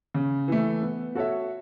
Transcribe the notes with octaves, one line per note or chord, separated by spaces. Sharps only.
C#3
E3 A3
B3
F#4 A4 C#5 E5